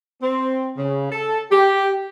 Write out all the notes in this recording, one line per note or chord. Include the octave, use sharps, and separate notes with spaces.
C4
C#3
A4
G4